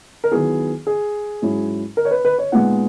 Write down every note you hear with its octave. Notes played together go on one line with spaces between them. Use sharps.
A#4
D#3 F#3 B3 E4 G#4
G#4
G#2 F#3 C#4 E4
A#4
C#5
B4
B4
C#5
A#2 G#3 B3 D#4 F#5